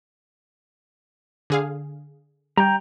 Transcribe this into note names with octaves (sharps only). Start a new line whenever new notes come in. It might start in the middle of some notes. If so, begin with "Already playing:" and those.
D3 G#4 F5
G3 G5 A#5